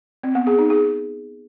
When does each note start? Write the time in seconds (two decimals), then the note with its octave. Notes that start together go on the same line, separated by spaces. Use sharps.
0.23 C4
0.35 B3
0.47 G#4
0.58 D#4
0.70 G#4